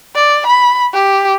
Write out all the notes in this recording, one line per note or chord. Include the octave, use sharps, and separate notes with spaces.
D5
B5
G4